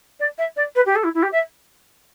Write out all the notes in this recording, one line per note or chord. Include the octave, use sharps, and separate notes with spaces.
D5
E5
D5
B4
G4
A4
E4
E4
G4
E5